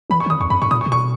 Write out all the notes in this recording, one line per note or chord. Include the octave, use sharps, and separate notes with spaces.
E3 B5
C#6
D#3 D#6
E2 C#6
F#2 B5
G#2 C#6
A#2 D#6
C#6
B2
C#6